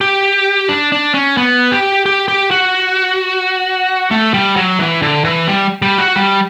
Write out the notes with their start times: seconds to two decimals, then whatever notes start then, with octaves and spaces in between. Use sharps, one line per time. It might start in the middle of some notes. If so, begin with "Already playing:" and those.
0.01 G4
0.69 D4
0.92 D4
1.14 C#4
1.37 B3
1.72 G4
2.06 G4
2.28 G4
2.51 F#4
4.11 A3
4.34 G3
4.56 F#3
4.79 E3
5.02 D3
5.25 E3
5.48 G3
5.82 G3
5.98 F#4
6.16 G3